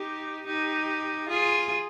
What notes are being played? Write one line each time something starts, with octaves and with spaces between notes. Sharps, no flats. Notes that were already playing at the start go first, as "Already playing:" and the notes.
Already playing: D#4 G4
D#4 G4
F4 G#4